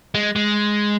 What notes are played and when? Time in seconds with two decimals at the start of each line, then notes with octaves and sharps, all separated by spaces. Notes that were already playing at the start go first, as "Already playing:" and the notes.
0.15 G#3
0.36 G#3